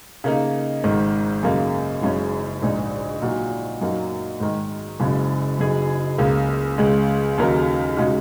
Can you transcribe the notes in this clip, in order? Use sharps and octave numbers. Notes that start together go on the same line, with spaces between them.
C#3 A#3 D#4
G#1 G#2 D#3
F#2 C#3 A#3 D#4
F#1 F#2 C#3 G#3 C#4
A#1 G#2 G#3 D#4
A#2 F#3 D#4 F#4
F#2 F#3 A#3 D#4 F#4
G#2 D#3 G#3
F#1 F#2 C#3 G#3
F#1 F#2 F#3 D#4 G#4
C#2 C#3 A#3
C#2 C#3 G#3
D#2 C#3 F#3 D#4 A#4
C#3 G#3 D#4 F#4